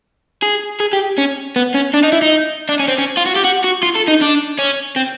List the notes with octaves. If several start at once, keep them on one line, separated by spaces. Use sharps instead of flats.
G#4
G#4
G4
C#4
B3
C#4
D4
D#4
E4
D#4
D4
C#4
C4
C#4
F4
F#4
G4
F#4
F#4
F4
A4
D#4
D4
C#4
C4